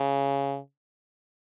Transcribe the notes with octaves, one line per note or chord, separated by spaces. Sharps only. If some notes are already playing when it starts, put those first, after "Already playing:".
Already playing: C#3